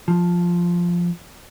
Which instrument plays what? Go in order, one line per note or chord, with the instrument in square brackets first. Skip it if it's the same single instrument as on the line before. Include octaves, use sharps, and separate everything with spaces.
[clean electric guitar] F3